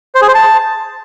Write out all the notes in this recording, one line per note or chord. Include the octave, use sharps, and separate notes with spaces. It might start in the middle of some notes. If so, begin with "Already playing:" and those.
C5
G#4
C5
A5